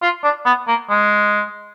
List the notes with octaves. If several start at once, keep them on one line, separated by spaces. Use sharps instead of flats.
F4
D4
B3
A#3
G#3